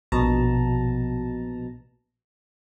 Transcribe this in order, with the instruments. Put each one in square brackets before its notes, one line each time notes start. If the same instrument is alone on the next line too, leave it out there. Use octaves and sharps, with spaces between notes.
[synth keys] A#1 B2 A5 A#5